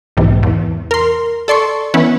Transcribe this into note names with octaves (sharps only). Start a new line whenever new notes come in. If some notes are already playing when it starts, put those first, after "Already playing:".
B1 G#2 C3 E3
E2
A#4 C6
A4 D5 C6 C#6
E3 B3 C#4 E4